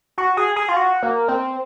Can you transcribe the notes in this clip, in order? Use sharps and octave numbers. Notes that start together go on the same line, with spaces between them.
F#4
G#4
G#4
F4
F#4
A#3
C4